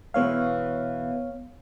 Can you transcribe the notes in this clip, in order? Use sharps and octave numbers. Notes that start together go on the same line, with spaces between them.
B2 E3 G#3 B3 C#5 F5